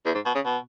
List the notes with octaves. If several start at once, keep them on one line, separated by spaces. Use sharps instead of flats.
E2
G#2
B2
C#3
B2